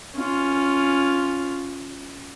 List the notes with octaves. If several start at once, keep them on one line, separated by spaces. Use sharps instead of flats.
C#4 F4